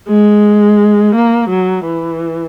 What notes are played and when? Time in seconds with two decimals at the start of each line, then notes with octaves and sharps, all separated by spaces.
0.09 G#3
1.16 A#3
1.50 F#3
1.86 E3